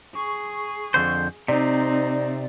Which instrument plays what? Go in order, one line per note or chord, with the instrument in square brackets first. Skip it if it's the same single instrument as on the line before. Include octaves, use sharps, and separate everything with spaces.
[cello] G#4 [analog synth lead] C#6
[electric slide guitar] F2 D3 C5
[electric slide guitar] C3 [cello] C4 D#4 [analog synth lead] D5